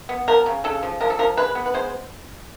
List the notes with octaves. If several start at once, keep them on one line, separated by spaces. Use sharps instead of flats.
B3
F3 A#4
C#3
C#3 A4
F3
F3 A#4
A4
F3 A#4
G#3 B4
B3
B4
G#3 C5